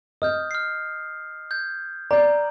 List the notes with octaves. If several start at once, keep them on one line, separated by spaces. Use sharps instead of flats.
D#5 D#6 F6 G6
F6 C7
G6 G#6
D5 A#5 G6